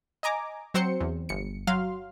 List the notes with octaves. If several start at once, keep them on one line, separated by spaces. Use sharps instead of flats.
D#5 G#5 A#5 D6
F#3 C4 C5 C6 C#7
E2
G1 C#7
F#3 F5 C6 F6